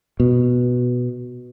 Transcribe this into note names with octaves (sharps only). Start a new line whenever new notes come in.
B2